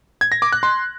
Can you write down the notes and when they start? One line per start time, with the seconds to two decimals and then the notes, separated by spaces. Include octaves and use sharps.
0.21 G#6
0.32 A#6
0.42 D6
0.52 F#6
0.63 C6